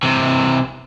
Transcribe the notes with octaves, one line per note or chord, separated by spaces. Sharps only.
C3 E3